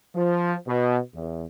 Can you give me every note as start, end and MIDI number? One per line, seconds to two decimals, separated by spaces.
0.15 0.54 53
0.66 0.98 47
1.14 1.44 40